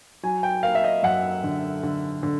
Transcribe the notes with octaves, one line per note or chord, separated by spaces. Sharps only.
F#3 G#5
G5
A#3 F5
E5
D#5
F#2 F#5
D3
D3
D3